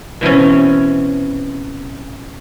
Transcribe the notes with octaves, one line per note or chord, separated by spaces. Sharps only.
B2 E3 C4 C#4